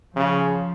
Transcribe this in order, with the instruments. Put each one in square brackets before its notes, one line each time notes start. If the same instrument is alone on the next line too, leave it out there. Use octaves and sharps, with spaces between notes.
[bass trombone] C#3 [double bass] F3